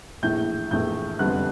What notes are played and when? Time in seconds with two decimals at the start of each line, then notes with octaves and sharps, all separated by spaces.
0.22 A#1 A2 E3 A3 G6
0.71 A#1 A2 E3 A3 G6
1.19 F1 F2 D3 G3 B3 F#6